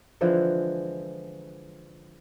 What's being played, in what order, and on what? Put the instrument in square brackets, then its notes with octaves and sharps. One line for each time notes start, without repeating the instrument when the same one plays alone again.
[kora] D3 E3 F3 G#3